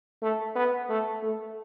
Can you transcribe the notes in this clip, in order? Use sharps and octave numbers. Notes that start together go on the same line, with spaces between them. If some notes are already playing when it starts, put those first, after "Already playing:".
A3
B3
A3
A3